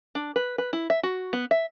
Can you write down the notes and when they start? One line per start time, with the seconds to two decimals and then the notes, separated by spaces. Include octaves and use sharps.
0.15 D4
0.36 B4
0.58 B4
0.73 E4
0.90 E5
1.03 F#4
1.33 B3
1.51 E5